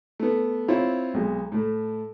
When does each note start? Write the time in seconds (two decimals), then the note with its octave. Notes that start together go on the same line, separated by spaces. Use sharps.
0.20 A3 B3
0.68 C4 E4 F4 C#5
1.14 B1 G#3
1.52 A2 A3